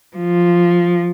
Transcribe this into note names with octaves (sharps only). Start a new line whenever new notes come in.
F3